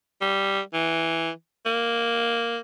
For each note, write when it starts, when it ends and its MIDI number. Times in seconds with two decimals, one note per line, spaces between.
0.21 0.61 55
0.74 1.30 52
1.66 2.59 58